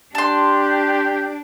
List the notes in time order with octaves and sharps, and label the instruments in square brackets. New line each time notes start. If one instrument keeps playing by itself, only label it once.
[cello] D4 [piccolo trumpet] G4 [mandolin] A5 C6